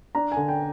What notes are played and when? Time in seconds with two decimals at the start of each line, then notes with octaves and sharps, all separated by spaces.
0.15 D4 A#5
0.32 D3 G#5
0.49 G5